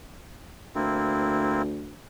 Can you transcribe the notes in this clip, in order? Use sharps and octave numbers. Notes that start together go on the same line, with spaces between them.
D2 A#3 C4 E4